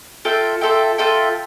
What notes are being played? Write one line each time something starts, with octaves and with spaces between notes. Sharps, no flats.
F4 A4 E5 G5
F4 A4 E5 G5
F4 A4 E5 G5